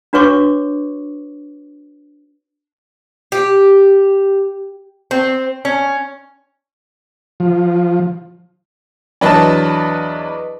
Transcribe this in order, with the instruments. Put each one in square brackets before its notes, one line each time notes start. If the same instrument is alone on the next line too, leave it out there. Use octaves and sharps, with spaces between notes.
[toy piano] D4 F#4 B4 C#5 C#6 D6
[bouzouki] G4
[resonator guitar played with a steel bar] C4
C#4
[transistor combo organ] F3
[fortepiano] E2 F#3 A5 [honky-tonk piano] D4 B4 D#5